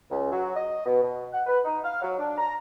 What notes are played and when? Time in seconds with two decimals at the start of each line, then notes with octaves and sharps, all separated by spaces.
0.11 C#2
0.32 F#3
0.55 D#5
0.85 B2
1.03 B2
1.33 F#5
1.46 B4
1.64 D#4
1.83 F5
2.01 F#3
2.19 D4
2.38 A#5